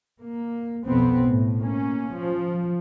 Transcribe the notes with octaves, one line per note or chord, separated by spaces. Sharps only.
A#3
B1 F2 B3 C4
A2
A#3 C#4
F3